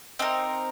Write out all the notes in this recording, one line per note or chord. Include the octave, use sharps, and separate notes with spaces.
C4 D#4 A#4